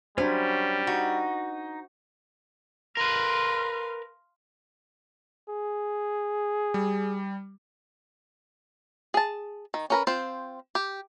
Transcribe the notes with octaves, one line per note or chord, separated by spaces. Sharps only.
F#3 G3 C#4 D4 E4 C5
D#4 F#4
A#4 B4 F5 C6
G#4
G3
G#4 A5
D#3
C#4 A#4 B4
C4 F4 C5
G4